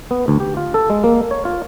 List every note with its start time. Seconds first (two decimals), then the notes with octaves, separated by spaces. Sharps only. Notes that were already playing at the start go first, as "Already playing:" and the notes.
0.11 B3
0.28 D2
0.40 G4
0.57 F4
0.74 A4
0.90 G#3
1.04 A#3
1.31 C#5
1.45 F4